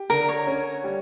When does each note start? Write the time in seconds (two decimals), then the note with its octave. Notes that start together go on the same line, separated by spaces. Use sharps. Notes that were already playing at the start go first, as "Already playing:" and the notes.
Already playing: G4
0.10 D3 A#4
0.28 C#5
0.47 C#4
0.84 G3